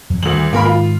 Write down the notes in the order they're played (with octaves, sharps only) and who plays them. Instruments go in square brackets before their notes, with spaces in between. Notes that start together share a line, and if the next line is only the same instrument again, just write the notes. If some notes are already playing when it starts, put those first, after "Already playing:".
[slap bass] F2 F#3
[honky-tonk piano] D2 F#7 [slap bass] D#3 G3
[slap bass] G#2 D#3 [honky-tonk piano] A#3 A#4 B5
[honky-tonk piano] F4